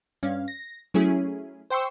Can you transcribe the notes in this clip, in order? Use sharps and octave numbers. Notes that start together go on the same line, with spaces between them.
G2 C#4 F5
A#6
F#3 A3 C#4 E4 G#4
C5 G5 C6 C#6 E6